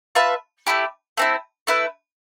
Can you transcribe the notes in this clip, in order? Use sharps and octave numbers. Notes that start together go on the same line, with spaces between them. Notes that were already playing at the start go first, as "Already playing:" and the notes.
F4 B4 E5 A5
A3 E4 G4
A3 C4 E4
A3 E4 B4